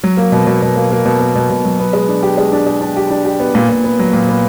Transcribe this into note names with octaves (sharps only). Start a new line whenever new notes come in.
F#3
A#3
B2
B2
B2
A#3
A#3
B2
A#3
B2
B2
F#3
B3
G#3
D4
G4
G#3
D4
G#3
D4
G4
D4
G4
B3
A#2
A#2
B3
F#3
A#2
B3